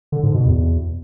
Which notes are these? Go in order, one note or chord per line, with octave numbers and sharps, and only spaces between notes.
D3
G#2
B2
E2